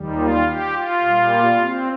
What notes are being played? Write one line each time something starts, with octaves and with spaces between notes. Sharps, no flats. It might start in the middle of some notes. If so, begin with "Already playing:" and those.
Already playing: D#2 D#3 G3
F4
G4
F4
A#2 G3
C4